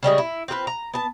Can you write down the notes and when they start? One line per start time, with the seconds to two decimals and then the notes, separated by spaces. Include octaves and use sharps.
0.03 C#3 G3 G#3 G#4
0.18 E4
0.48 C4 F4 A4 B4
0.67 A#5
0.94 B3 A5